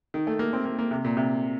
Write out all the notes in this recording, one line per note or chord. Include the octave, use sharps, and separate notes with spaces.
D#3
A3
A#3
C4
A#3
A#3
C3
A#2
C3